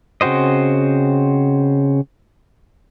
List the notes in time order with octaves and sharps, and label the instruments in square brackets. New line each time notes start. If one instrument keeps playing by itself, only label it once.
[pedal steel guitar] C#3 C4 F#4 C5 D#5